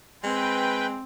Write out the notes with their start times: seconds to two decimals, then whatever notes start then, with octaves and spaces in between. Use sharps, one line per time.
0.24 G#3 C4 B4 G5